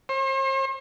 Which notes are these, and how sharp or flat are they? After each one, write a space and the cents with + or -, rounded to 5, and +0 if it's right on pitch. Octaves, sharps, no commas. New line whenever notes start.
C5 +40